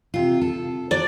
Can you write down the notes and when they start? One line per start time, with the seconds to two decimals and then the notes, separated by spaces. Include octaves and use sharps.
0.14 C3 F4
0.41 A4
0.91 F#3 D5